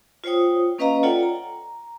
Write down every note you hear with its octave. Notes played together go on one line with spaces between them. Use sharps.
F4 C5 C#5 G5 D#6
A#3 C#4 B4 D#5 F5 A#5
F4 A4 C#5 D5 F#5 G5
A#5